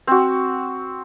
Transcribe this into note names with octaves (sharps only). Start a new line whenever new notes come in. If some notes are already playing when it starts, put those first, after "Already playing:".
C4 F#4